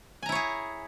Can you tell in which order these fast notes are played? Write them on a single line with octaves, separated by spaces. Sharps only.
G#5 A#5 E4 C#5 G#4